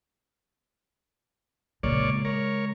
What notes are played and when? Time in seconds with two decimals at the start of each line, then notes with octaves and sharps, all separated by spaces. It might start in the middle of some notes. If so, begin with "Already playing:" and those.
1.83 A#2 C#3 G#3 C#5 D5
2.25 A#4 C#5